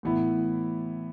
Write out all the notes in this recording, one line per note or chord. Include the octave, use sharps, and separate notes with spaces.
A2 E3 B3 E4